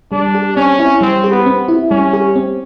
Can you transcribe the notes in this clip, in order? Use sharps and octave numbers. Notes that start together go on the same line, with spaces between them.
G3 D4
G4
C4 C#4
E4
G3 C4
G4
B3
C4
E4
G3 C#4
G4
C4